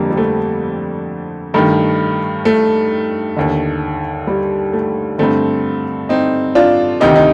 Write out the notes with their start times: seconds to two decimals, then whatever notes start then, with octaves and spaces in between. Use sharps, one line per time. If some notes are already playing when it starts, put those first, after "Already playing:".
Already playing: F2 D3 G3 A#3
0.10 G3
0.17 A3
1.54 G2 D#3 A3
2.45 A3
3.37 D#2 D3
4.27 G3
4.73 A3
5.18 G2 D3 A3 C4
6.09 C4 D#4
6.55 D4 F4
7.00 D2 C3 D#3 D#4 G4
7.16 D#4